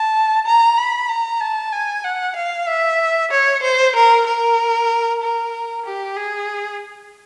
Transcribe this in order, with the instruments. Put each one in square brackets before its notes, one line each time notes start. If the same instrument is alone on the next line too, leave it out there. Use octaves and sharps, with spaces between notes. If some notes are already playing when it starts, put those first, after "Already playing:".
Already playing: [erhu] A5
A#5
B5
A#5
A5
G#5
F#5
F5
E5
C#5
C5
A#4
A#4
A#4
G4
G#4